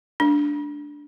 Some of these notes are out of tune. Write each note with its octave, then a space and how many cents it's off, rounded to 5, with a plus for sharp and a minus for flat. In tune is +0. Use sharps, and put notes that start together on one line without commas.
A3 -45 D4 -5